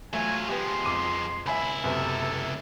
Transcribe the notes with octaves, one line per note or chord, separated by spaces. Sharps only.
F#3 A3 F4 G#5
F3 G#3 B3 G4 C6
F2 D6 D#7
C#2 E4 E5 G#5 B5
F#2 C3 B3 A4